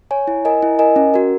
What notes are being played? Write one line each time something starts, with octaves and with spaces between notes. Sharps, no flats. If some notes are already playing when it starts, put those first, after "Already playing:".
C#5 G#5
E4
A#4 D#5 G#5
E4
A#4 D#5 G#5
C#4
F#4 A#4